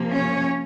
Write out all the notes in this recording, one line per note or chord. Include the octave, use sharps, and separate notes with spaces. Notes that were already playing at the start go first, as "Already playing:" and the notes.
Already playing: C3 F3 A#3
C#4 C#5